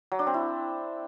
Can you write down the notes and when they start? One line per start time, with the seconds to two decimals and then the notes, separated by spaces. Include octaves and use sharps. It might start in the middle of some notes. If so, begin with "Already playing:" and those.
0.12 F#3
0.19 D4
0.27 C4
0.34 E4